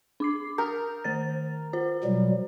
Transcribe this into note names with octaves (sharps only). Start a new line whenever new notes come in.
D4 D6 C7
A#4 D#6 F6 G6
D#3 C5 A6
F4 C5
B2 F#3 G3